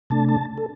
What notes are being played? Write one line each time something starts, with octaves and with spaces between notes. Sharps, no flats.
C3 A3 D4 A5
A5
A4